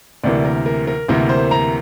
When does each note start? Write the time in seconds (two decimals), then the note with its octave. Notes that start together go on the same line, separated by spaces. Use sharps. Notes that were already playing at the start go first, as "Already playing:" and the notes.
0.23 D2 C3 E3 A#3 D5
0.45 A#4
0.66 A#4
0.87 A#4
1.08 D2 C3 E3 A#3 A#4
1.29 C5
1.51 A#5